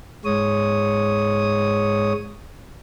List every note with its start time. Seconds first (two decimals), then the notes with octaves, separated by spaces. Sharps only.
0.25 G#2 G#3 C#5 D#6